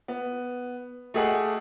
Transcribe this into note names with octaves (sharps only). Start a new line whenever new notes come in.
B3
A3 G4 G#4 D#5 F#5